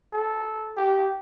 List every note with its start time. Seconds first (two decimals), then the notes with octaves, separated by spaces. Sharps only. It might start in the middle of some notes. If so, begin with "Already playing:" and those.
0.13 A4
0.77 G4